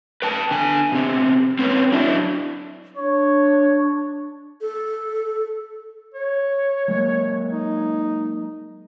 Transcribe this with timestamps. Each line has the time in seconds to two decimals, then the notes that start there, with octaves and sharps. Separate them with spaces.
0.22 B4 G5 A5
0.51 D3 G#5
0.92 B2 C4
1.59 C4 C#4 B4
1.92 F#3 D4 E4
2.97 D4 C#5
4.61 A4
6.14 C#5
6.88 F#3 G#3 A#3
7.52 D#4